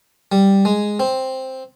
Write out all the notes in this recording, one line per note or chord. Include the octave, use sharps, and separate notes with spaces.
G3
G#3
C4